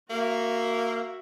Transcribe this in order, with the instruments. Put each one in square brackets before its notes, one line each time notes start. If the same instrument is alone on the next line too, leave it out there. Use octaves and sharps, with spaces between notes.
[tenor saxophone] A#3 [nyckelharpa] F#4 E5